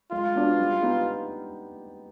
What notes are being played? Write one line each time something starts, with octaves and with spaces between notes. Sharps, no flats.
G#3 F4
B3 D4 F#4
G3
B3 D#4 G4